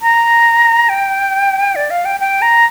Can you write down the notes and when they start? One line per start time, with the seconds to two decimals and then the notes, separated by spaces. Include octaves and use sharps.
0.02 A#5
0.89 G5
1.76 D5
1.90 F5
2.05 G5
2.20 G5
2.42 A#5